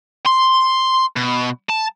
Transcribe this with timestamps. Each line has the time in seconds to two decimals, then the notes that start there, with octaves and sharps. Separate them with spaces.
0.26 C6
1.16 B2
1.69 A5